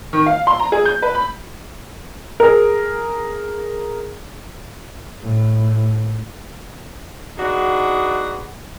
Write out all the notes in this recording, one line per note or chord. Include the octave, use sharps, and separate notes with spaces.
D#3
F5
C6
A#5
G#4
G6
B4
B5
G#4 A#4
A2
A#3 B3 D4 D#4 F#4 G#4